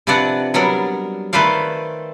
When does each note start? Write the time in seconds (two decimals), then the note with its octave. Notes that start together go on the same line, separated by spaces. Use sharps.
0.07 C3 F3 D4 B4 D5 F#5
0.54 F#3 G3 B3 D4 A#4
1.33 D#3 A3 B4 C5 D5 F5